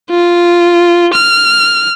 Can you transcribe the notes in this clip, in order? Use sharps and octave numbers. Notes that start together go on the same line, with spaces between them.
F4
F6